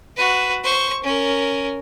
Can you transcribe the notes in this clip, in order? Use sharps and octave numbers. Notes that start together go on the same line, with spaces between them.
F#4 B4
C5 C#6
C#4 A#4